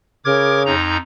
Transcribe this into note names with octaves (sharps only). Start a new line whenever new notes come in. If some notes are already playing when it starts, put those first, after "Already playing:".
C#3 A#4 D6 G#6
F2 D#4 A#5